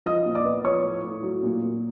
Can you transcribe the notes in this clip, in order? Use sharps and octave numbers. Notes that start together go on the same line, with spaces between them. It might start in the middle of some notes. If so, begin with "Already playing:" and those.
F3 D#5 D#6
A#2
D5 D6
B3
F3 C#5 C#6
A2
A2
F#3
A#2
A#2